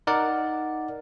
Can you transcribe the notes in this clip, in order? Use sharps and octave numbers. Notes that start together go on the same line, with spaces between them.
D#4 A#4 D5 F#5